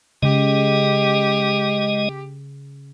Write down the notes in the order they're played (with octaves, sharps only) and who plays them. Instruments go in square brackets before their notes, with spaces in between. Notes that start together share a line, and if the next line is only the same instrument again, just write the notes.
[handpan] C#3 [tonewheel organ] G#3 D#5 [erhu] G4